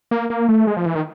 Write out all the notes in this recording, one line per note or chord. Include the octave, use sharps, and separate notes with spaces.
A#3
A#3
A3
G#3
F3
E3
D#3